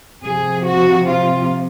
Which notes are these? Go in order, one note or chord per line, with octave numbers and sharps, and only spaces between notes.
C3 F3 G#4
F#4
F4